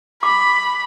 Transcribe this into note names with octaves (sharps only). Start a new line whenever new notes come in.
B5 D6